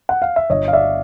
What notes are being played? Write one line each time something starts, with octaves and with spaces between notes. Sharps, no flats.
F#5
F5
E5
G1 C#5 D#5
F5
D5 E5